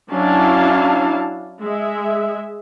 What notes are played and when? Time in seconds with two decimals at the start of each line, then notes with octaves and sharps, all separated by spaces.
0.12 F#3 C#4 D4 E4 F5 A5
1.62 G#3 E5